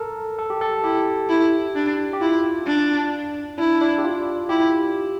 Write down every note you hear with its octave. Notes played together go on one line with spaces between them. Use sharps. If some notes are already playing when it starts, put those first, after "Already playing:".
Already playing: A4 A#4
A4
G4
A4
E4 G4
E4
D4
G4
E4 F4
D4
D4 E4
D4
G4
F4
E4 G4